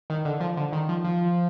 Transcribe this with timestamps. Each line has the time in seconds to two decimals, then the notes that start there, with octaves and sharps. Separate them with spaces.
0.10 D#3
0.25 D3
0.40 F3
0.57 D3
0.72 D#3
0.89 F3
1.04 F3